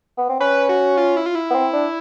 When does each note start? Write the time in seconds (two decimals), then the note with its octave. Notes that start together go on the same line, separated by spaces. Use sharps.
0.18 B3
0.29 C4
0.40 C#4 B4
0.69 F#4
0.97 F4
1.17 E4
1.26 F4
1.35 E4
1.50 B3
1.54 C4
1.73 D4